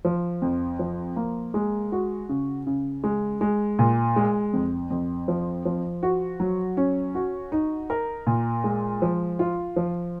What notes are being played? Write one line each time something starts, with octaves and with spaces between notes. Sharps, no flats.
F3
F2
F3
A#3
G#3
F#4
C#3
C#3
G#3
G#3
A#2
G#3
F2
F2
F3
F3
F#4
F#3
C#4
F#4
D#4
A#4
A#2
G#3
F3
F4
F3